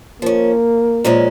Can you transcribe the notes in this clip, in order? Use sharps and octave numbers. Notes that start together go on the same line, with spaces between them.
F3 A#3 C#4
A#2 F3 G#3 C#4